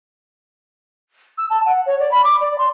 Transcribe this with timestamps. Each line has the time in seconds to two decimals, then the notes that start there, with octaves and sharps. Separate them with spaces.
1.38 E6
1.50 A5
1.65 F#5
1.86 C#5
1.99 D5
2.11 B5
2.24 D6
2.40 D5
2.58 C6